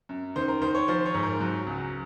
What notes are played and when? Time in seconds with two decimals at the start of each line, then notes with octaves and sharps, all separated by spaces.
0.09 F#2
0.36 D#3 C5
0.48 A#4
0.62 D#3 C5
0.75 C#5
0.88 F3 C5
1.06 C#5
1.14 G#2
1.23 A#4
1.40 F#3
1.66 C#2